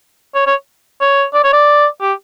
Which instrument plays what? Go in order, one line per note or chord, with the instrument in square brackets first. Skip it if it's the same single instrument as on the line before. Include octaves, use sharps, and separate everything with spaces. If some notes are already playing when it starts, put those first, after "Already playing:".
[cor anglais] C#5
C#5
C#5
D5
C#5
D5
G4